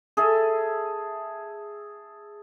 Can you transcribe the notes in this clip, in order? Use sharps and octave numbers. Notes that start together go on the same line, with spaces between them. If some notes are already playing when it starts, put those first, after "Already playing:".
G#4 A4 E5